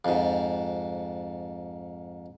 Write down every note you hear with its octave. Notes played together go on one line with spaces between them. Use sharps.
F2 G#2